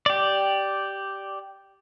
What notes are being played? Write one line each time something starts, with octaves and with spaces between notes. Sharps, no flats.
G4 D5